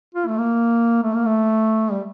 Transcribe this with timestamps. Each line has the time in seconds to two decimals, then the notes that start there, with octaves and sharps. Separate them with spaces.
0.15 F4
0.27 A3
0.38 A#3
1.03 A3
1.15 A#3
1.26 A3
1.92 G3